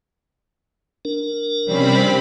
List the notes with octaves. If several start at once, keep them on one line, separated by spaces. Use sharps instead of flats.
D4 A#4
C3 F3 G3 C4 C#4 B5